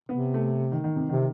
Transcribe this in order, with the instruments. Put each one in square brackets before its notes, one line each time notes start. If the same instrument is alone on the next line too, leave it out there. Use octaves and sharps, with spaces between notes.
[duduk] C3 [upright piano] B3
[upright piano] A3
D#3
D#3
C3
[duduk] C3 [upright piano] D#3